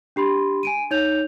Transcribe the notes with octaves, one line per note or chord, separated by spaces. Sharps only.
D4 G4 B5 C6
G#5 D7 D#7
D#4 C#5 G6 F7